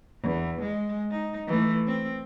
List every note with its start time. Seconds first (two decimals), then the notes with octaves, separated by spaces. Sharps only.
0.21 E2
0.61 G#3
1.11 D#4
1.47 E3 A3
1.87 C4